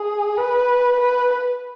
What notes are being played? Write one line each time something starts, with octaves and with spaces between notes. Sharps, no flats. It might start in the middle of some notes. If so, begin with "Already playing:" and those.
Already playing: G#4
B4
B4